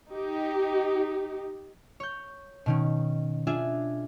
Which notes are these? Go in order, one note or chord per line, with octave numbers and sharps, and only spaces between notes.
D#4 G4
C#5 G6
B2 D#3 C#4
D4 F4 G#4 E5 G#5